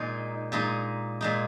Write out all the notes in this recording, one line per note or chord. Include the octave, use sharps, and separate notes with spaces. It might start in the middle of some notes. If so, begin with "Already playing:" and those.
Already playing: A#2 G#3 D#4
A#2 G#3 D#4
A#2 G#3 D#4